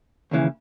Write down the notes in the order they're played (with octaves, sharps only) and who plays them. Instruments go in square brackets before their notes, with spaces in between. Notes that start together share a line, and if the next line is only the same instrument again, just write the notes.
[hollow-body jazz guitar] D#2 C#3 E3